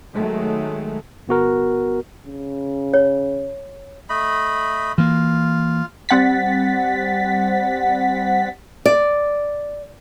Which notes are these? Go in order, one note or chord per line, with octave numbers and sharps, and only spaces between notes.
D#3 F#3 G#3 A3
G1 B3 F#4 A#4
C#3
C#5
A3 D#5 B5
E3 A#3 F4
G3 C4 F#5 A6 B6
D5